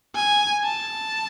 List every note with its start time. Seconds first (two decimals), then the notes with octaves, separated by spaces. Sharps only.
0.15 G#5
0.65 A5